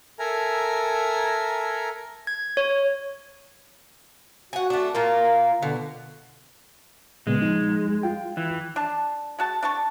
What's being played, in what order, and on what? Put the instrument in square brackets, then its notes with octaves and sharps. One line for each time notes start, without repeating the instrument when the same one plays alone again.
[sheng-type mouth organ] A4 A#4 E5 G#5 A#5
[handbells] G#6
C#5
[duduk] F#4 [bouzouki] F#5 G#5
[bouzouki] A3 D4
[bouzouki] A#2 A#3 F4 [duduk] A#4
[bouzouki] B2 [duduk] D3
[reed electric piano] A#2 C#3 B3 [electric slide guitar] G#3
[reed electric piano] F3 D#4
F4 G5
[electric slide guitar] E3
[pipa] D4 A5
G#3 F#4 A5
D4 A5 C#6